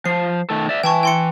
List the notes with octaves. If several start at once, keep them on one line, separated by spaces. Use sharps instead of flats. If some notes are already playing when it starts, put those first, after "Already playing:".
F3 C7
D#3 A3 A4
D5 E5
E3 G5 A5 C#6
G5 C6 C#7